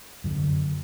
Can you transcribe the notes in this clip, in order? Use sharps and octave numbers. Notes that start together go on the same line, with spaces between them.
F#2 D3